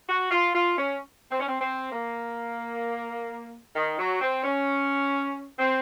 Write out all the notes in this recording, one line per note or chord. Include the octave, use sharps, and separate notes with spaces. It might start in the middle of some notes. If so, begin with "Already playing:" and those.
F#4
F4
F4
C#4
C4
C#4
C4
C4
A#3
D#3
F#3
C4
C#4
C4